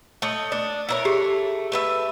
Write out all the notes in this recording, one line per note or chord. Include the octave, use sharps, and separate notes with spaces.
A3 C#5 D#5
D4
E4 A#4 C#5
A3 G4 G#4
A3 B4 E5